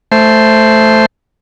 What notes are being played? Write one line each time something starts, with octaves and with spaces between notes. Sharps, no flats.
A3 C5